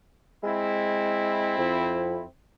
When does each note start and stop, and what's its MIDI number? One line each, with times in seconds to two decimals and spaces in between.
0.43 1.57 56
0.43 2.24 60
0.43 2.24 64
1.58 2.21 41